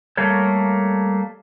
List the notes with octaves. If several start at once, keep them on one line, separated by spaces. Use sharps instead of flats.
G3 A3 A#3 A4 C#5